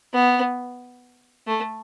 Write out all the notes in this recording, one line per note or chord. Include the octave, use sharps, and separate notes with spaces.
B3
A3